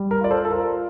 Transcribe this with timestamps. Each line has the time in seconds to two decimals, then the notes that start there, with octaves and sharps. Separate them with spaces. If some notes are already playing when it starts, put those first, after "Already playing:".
Already playing: G3
0.11 A#4
0.21 F4 D5
0.31 A4 C5
0.45 A4
0.50 F4 A#4